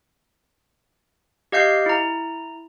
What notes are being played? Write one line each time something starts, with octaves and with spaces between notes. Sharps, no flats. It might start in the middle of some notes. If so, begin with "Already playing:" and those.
G4 D#5 F5 G6 C7
E4 A#5